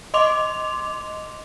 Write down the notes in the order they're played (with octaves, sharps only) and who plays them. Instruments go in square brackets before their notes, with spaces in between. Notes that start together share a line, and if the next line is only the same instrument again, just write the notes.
[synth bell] D#5 C6 D6 F7